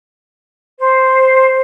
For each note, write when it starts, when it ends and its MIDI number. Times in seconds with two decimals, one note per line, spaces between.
0.79 1.61 72